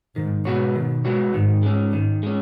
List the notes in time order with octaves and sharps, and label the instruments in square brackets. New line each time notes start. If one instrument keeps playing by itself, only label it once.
[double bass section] G#2 [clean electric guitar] D#3
[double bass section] B2 [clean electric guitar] G#3 B3 F#4 C#5
[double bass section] B2 [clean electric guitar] D#3
[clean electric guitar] G#3 B3 F#4 C#5
[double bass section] G#2 [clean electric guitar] D#3
[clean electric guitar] G#3 C#4
[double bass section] G#2 [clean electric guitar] D#3
[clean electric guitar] G#3 C#4